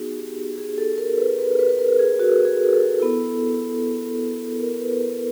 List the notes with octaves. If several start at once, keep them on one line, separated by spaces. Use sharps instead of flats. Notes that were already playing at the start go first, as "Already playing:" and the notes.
Already playing: B3 D#4 F#4 G#4
G4
G#4
A4
A#4
B4
B4
B4
B4
A#4
G#4
F#4
G#4
A4
B3 E4
A#4
B4
A#4